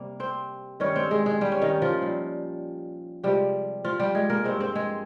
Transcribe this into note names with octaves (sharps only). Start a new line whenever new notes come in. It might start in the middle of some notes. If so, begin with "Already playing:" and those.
Already playing: C3 G3 A#3
C4 C5
G2 D#3 G3 C#4 C#5
C4 C5
G#3 G#4
G#3 G#4
G3 G4
C#4
D#3 D#4
F3 F4
A#2 G3
C3 F3 G3 G#3 G4
F3 F4
G3 G4
G#3 G#4
A#3 A#4
G2 F3 G#3 C4 C5
C4 C5
G#3 G#4